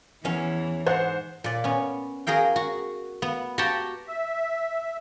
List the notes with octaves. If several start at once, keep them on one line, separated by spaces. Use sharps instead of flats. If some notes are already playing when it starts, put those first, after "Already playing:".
E2 E3 C#4
G#2 C5 F#5
A#2 D5
B3 C#4
F#4 G#4 A#4 F5 G5
F#4
B3
F#4 G4 F#5 G5 A5 A#5
E5